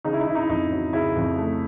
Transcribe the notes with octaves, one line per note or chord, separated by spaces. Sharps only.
C#3 D#4
E4
D#4
C#3 E4
D#4
E4
F2 D#4
F#3
C#3 E4
F2
A3